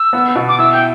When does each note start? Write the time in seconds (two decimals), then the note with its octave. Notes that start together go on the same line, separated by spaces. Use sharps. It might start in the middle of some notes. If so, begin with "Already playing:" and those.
Already playing: E6
0.13 B3
0.36 B2
0.48 D6
0.59 E4 E6
0.73 G5